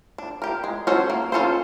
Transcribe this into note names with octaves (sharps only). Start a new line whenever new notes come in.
D4
G4 A#4
G#3
C#4 F#4 A4 C5
A#3
C#4 F4 A4 C5